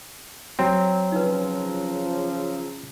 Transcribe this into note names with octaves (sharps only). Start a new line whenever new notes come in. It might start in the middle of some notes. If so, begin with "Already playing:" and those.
F#3 C4
C#3 F3 D#4 B4